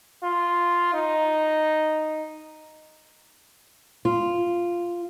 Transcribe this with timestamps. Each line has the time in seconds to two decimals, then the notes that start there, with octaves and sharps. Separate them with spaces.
0.23 F4
0.94 D#4
4.05 F4